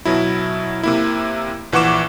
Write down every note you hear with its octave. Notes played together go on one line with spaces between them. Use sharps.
B2 F#3 E4
C3 A#3 E4
A#1 E3 F#5 C#6 D6 E7